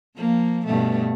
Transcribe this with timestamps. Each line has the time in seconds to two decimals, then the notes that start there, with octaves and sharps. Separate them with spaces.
0.16 F3 A#3
0.65 G2 B2 A3